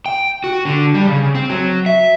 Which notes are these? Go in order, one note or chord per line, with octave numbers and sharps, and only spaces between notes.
G5
F#4
D3
G3
C#3
C4
F#3
E5